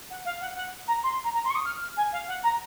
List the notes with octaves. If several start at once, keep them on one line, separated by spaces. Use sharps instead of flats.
F#5
F5
F#5
F#5
A#5
C6
A#5
A#5
C6
C#6
D#6
F6
F6
G#5
F5
F#5
A#5